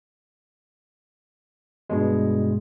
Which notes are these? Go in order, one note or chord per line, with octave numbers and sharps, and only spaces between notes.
G2 B2 G#3